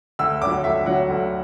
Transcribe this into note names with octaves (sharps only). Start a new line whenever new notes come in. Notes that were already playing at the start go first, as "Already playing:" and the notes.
D2 E6
D3 F#3 D6
D2 E5
D3 F#3 F#5
D2